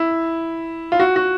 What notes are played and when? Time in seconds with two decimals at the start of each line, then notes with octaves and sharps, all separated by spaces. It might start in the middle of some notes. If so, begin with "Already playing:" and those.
Already playing: E4
0.92 F4
1.00 F#4
1.16 F#4